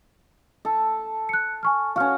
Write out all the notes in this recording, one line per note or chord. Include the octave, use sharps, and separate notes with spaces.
A4
F#6 C#7
G#5 C#6 F6
C#4 F#4 F5 F6